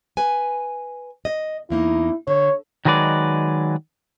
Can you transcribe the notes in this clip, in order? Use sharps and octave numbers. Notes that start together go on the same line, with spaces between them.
B4 G#5
D#5
E2 A#3 D#4 E4
D3 C#5
D#3 F#3 G#3 B4 D5